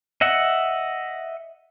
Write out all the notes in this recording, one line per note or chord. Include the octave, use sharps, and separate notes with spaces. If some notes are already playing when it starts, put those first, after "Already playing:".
D#5 E5 F#5